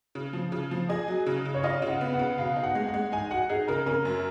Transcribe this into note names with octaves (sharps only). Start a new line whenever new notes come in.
C#3
F3
C#3
F3
G#4 D#5
F#3
C#3
C#3
C#5
F4 D#5
C#3
F#5
B3
F#5
C#3
B2 F5
D#4
F#5
G#3
F#5
G#3
D#4 G#5
F#4 F#5
D#4 G#4
C#3 A#4
C#4 A#4
F#2